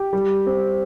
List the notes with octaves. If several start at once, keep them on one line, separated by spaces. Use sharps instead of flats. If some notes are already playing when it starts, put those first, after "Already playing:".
Already playing: G4
G3
C4